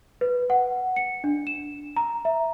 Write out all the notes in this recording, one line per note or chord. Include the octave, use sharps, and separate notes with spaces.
B4
F#5
C#7
D4
E7
A#5
E5